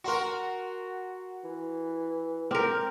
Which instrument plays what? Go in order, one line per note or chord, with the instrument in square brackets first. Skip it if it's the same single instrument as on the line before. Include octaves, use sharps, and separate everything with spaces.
[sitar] F#4 A#4 [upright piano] F#5 C6 C#6
[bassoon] E3
[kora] C4 A#4 [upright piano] D6 F6